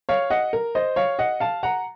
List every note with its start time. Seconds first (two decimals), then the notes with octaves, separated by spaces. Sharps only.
0.09 C#5 F5
0.30 D#5 F#5
0.53 A#4
0.75 C5 D#5
0.96 C#5 F5
1.19 D#5 F#5
1.40 F5 A5
1.63 F#5 A#5